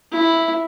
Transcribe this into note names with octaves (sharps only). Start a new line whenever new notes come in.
E4